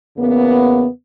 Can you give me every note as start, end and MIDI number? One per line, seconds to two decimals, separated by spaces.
0.18 0.86 40
0.18 0.86 49
0.18 0.86 58
0.18 0.86 59